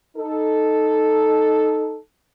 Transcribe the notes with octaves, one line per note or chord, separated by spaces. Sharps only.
D#4 A4